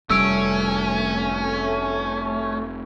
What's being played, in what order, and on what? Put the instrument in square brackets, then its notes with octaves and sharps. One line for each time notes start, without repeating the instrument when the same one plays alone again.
[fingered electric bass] F1 G3 [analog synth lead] A3 [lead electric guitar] C#4 [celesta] E6 D7